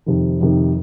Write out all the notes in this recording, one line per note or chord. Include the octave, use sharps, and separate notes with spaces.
F2 C3 D#3
F2 C3 D#3